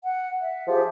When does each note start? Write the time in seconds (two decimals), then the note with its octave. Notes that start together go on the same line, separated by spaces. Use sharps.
0.03 F#5
0.41 E5
0.68 F3 G4 G#4 E5